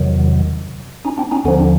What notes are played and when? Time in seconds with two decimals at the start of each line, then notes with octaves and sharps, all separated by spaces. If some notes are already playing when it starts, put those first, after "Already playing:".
Already playing: E2 C3 D#3 F#3
1.05 C#4 D#4
1.18 C4 D4
1.31 C#4 D#4
1.44 D#2 D3 F3 B3 C#4
1.58 C4 D4